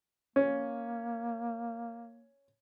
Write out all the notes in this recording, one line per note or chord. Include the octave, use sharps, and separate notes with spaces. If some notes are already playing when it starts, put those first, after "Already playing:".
A#3 C#4